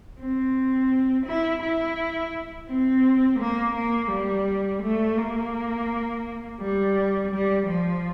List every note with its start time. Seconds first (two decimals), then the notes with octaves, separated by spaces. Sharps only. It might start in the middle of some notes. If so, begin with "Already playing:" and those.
0.21 C4
1.27 E4
1.63 E4
2.70 C4
3.40 A#3
3.76 A#3
4.12 G3
4.83 A3
5.18 A#3
6.61 G3
7.32 G3
7.67 F3